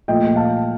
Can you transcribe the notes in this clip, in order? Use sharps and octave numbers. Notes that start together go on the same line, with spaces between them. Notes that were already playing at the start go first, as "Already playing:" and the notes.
A#2 F3 A3 D#5 G5
G5
F5 A5